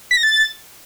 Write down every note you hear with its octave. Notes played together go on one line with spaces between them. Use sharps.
B6
A#6
A6